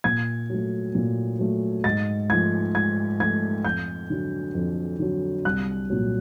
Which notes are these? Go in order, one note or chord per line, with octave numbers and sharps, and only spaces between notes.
A#2 G#6
F#3 A3
A#2
F#3 A3
G#2 A6
F3 A3 G#6
G#2 G#6
F3 A3 G#6
F2 G6
D3 F#3
F2
D3 F#3
C2 F#6
A#2 F#3